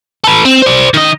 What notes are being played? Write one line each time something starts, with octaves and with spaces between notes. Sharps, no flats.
A4 B4
C4
C5 D5
D#3 D#5